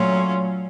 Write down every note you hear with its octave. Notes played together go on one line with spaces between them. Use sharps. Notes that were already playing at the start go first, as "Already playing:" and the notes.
Already playing: A#2 F#3 A3 C#4 F4